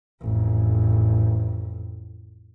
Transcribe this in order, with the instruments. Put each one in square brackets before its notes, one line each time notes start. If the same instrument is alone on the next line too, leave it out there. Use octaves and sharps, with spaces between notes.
[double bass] A1 F2